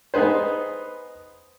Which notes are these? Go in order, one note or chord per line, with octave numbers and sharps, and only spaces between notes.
B3 D#4 G#4 B4 C5